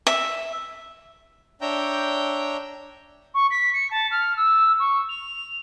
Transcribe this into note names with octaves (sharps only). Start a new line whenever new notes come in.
E5
D4 C#5 E5 G5 A#5 G6
C#6
B6
C#7
A5
F6
E6
C#6
F7